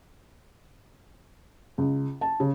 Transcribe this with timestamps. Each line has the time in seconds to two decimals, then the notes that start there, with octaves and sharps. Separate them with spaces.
1.78 C#2
2.21 A5
2.40 C#3